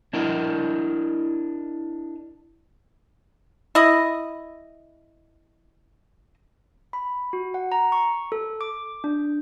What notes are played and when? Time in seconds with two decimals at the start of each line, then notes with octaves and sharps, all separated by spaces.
0.13 D4 E4 A#4 D#5
3.75 E4 D#5
6.93 B5
7.33 F#4
7.54 F#5
7.72 A#5
7.92 C#6
8.32 A4
8.61 D6
9.04 D4